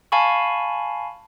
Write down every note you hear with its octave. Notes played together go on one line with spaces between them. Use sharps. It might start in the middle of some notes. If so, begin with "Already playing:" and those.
F5 G#5 A5 B5 C#6